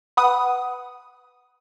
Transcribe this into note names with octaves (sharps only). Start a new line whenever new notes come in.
B4 F#5 D#6